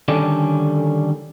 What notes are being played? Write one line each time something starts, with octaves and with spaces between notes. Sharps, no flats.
D3 D#3 G3 C#4 A4 D5